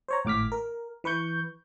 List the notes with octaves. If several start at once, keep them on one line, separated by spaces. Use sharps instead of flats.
C5 C#5 A#5
G#1 A2 D6 F6 B6
A#4
E3 B4 C#6 G6